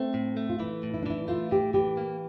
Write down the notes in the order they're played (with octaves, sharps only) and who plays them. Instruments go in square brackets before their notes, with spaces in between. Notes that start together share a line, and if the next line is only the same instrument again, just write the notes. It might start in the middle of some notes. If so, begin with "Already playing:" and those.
Already playing: [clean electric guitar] A3 [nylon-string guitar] C4
[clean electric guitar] A2
A3
[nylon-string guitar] F4
[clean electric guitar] E3 [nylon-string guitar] E4
[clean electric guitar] A2
[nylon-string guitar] E4
D4
[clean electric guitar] E3 [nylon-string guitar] E4
[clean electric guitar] A3 [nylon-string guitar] F4
[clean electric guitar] A2 [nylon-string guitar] G4
[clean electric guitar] E3 [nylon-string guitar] G4
[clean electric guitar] A#3